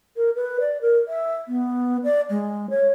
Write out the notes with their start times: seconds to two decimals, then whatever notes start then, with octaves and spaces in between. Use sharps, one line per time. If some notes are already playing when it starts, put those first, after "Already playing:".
0.16 A#4
0.36 B4
0.60 D5
0.82 A#4
1.08 E5
1.48 B3
2.04 D5
2.30 G#3
2.70 C#5